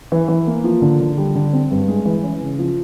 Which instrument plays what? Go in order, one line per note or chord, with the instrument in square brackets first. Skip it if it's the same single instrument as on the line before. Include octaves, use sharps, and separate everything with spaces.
[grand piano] E3
E3
A#3
F3
D3
D3
G3
D3
C4
G2
G#3
E3
C#4
C#3
F3